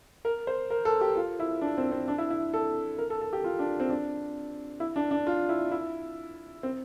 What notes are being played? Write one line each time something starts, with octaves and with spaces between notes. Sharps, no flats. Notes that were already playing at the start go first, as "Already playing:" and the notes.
A#4
C5
A#4
A4
G4
F4
E4
D4
C4
C4
D4
E4
E4
A4
A#4
A4
A4
G4
F4
D4
C4
D4
E4
D4
D4
F4
E4
E4
C4